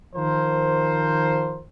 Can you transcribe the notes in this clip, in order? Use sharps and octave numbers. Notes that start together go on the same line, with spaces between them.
D#3 F3 A#4 C5